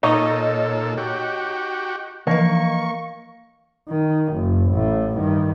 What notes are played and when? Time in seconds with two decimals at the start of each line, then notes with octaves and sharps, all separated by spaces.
0.03 A#2 D#4 A4 C#5 D#5
0.98 F#4 G4
2.27 E3 F3 A#3 D#5 C#6
3.89 D#3
4.33 F#1
4.71 A1 A2
5.17 G2 D#3